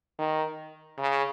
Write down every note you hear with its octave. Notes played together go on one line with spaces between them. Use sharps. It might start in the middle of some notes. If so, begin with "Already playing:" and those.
D#3
C#3